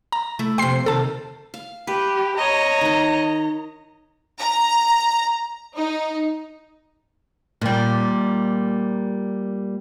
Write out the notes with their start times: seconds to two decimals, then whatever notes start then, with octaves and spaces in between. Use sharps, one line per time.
0.12 A#5
0.39 A3 E4
0.58 F2 C3 G5 C6 C7
0.86 C3 D#3 A4 A5
1.54 F5
1.87 G4 B4
2.37 C#5 D#5 A#5
2.81 D#3 D#4
4.40 A#5
5.76 D#4
7.62 A#2 G3